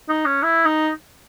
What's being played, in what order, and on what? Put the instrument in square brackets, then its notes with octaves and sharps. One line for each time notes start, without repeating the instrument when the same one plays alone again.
[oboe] D#4
C#4
E4
D#4